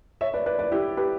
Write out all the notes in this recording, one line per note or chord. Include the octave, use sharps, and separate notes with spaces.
C#5 E5
B4 D5
B4 D5
B4 D5
E4 G4
G4 B4